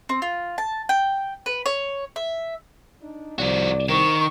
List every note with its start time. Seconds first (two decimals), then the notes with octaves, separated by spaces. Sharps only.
0.09 C4
0.22 F4
0.58 A5
0.89 G5
1.46 B4
1.66 C#5
2.16 E5
3.02 D4 D#4
3.39 C2 F3 F#4 D5
3.89 G#2 D#3 C5 C#6